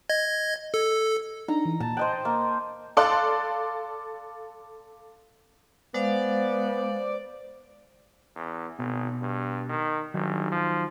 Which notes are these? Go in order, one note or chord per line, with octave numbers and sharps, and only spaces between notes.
D#5 G#6
A4
D4 D#4 A#5
E3
A#2 A5
C5 D#5 G5 F#6
A5
A#3
A4 D5 F5 C6 F#6
G#3 B3 C5 D5 F5
E2
G#1 B2
G2
D#3
G1 D#3 F#3 D#4
F3